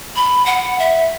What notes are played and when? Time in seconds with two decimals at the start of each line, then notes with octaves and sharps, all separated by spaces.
0.16 B5
0.46 F#5
0.79 E5